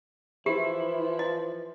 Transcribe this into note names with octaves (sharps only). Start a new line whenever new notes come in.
E3 F3 E4 G4
D#5